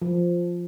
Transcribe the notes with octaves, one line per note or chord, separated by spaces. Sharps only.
F3